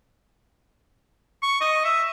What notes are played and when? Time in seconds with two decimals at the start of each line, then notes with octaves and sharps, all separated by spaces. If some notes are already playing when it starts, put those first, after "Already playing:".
1.42 C#6
1.61 D#5
1.85 E5